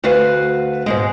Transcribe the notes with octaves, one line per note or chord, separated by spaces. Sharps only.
D2 A3 F#4 B4 F5
G#2 B2 G#3